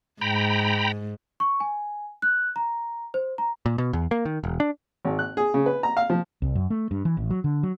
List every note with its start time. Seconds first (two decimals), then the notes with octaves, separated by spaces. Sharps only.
0.21 G#2 G5 A#5 B5
1.40 C#6
1.60 G#5
2.22 F#6
2.56 A#5
3.14 C5
3.38 A#5
3.66 A#2
3.78 B2
3.93 E2
4.11 A#3
4.25 D#3
4.44 E1
4.60 D4
5.05 G#1
5.19 F#6
5.37 G#4
5.54 C#3
5.66 B4
5.83 A#5
5.97 F5
6.10 F3
6.42 C2
6.55 F#2
6.70 A3
6.91 G2
7.05 E3
7.17 A1
7.30 F#3
7.44 D3
7.63 F#3